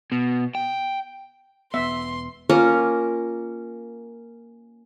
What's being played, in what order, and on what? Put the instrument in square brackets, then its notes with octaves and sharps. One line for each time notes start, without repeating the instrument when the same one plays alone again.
[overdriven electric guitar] B2
G5
[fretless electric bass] E1 B3 [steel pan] E5 [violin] C6
[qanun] A#3 C#4 F4 A#4